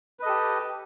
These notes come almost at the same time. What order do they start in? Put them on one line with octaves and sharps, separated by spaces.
B4 D#5 A4 G4